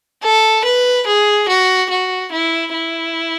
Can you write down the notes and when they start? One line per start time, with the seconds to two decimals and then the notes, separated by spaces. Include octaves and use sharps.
0.23 A4
0.64 B4
1.06 G#4
1.48 F#4
1.90 F#4
2.32 E4
2.73 E4